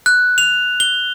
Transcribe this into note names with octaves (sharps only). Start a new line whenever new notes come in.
F#6
F7
G7